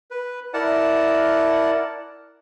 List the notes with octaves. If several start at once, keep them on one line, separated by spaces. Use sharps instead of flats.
B4
E4 A#4 D5 F#5 A5